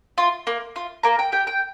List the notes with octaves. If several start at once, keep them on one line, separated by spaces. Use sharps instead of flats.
F4
A#3
F4
A#3 A#5
G5
G4 G5
G5